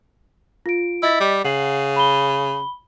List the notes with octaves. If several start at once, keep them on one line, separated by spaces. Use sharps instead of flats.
F4 D7
E4 D#5 A6 B6
G3
C#3 F#5 C7 F#7
B5 G7